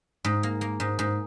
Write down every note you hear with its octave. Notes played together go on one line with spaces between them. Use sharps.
G#2
A#3
A#3
G#2
G#2